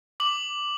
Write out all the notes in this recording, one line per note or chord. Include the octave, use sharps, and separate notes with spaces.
D6 F#7